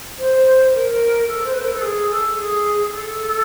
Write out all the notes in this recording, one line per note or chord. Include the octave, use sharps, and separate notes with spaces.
C5
A#4
A4
C5
B4
A#4
A4
G#4
A4
G#4
A4